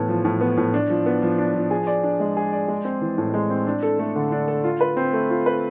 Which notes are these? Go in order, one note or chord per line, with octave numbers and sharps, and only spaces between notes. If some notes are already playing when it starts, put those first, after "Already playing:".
Already playing: A2 E3 B3
F3
A2
B3
A2
D4
F3
B3
F3
D4
F3
G#4
D5
D4
G#3
G#4
D5
G#3
C4
E3
A2
G#3
C4
D4
A4
A3
D3
D4
A4
F4
B4
C4
A3
F4
B4